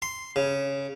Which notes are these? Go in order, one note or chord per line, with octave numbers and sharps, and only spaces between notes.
C6
C#3